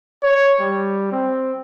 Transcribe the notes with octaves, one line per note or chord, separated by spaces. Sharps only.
C#5
G3
C4